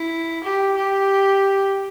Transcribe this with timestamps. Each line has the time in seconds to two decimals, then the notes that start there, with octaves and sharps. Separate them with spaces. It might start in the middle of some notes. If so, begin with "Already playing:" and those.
Already playing: E4
0.44 G4
0.77 G4